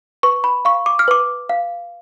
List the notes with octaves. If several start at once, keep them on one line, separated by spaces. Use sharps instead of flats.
B4 C#6
B5
F5 C#6
D6
F6
B4 D6
F5